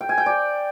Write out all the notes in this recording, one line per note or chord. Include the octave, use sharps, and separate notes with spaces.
G5
G#5
G5
D5